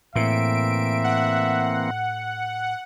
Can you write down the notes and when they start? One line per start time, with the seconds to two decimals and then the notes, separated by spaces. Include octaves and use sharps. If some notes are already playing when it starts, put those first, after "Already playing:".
0.16 A2 E3 A#3 C4 E5 D7
1.04 F#5